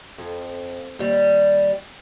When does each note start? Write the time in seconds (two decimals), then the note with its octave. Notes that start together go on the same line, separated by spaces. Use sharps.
0.18 F2
0.99 D#2 G3